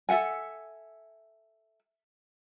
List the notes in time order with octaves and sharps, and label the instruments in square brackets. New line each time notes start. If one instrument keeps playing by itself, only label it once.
[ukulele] A4 E5 F#5 G#5